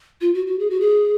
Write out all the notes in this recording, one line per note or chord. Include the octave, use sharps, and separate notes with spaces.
F4
F#4
F#4
G#4
F#4
G#4